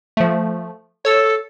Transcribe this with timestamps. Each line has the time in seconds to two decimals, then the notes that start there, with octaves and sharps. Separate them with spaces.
0.17 F3 A3
1.05 A4 C#5 E6